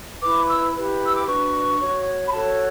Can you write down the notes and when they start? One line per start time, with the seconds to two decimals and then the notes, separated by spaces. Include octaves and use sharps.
0.23 E4 B4 D6
0.45 D6
0.49 E6
0.75 E4 G4 B4
1.04 E6
1.16 D6
1.27 D4 F#4 B4 C#6
1.80 F#4 C#5
2.27 B5
2.32 F#4 A4 C#5 A5